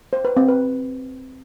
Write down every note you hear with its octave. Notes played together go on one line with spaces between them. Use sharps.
C5
B4
C4
B4